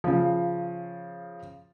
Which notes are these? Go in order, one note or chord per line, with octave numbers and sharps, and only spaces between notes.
C#3 F3